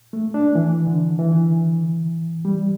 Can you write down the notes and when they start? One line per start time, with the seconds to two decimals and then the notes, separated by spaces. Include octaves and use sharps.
0.13 A3
0.34 D4
0.55 E3
0.87 D3
1.19 E3
2.45 G3